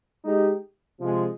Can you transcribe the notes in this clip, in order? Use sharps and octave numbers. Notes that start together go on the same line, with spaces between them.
G#3 D#4 G4
C3 F3 G#3